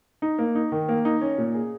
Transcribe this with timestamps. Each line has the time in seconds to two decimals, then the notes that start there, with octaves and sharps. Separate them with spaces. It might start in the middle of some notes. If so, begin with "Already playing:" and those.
0.22 D#4
0.39 A#3
0.55 D#4
0.72 D#3
0.89 A#3
1.05 D#4
1.21 C#4
1.38 A#2
1.54 G#4